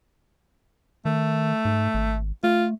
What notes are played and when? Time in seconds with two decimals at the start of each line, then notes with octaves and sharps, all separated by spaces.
1.05 D#3 A3
1.65 G#2
1.94 G#1
2.44 A3 F4